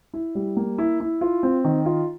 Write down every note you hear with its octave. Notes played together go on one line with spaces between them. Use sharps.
E4
G3
A#3
E4
E4
F4
C4
D#3
F4